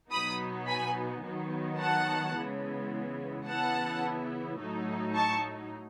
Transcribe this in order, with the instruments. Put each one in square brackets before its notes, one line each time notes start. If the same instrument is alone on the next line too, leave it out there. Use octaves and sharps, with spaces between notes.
[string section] B2 F#3 B3 D#4 B5 D#6
G#5 B5
D#3 F#3 B3 D#4
F#5 A5
C#3 E3 G#3 B3
C#3 E3 B3 E4 F#5 A5
A2 F#3 A3 D#4
A5 C#6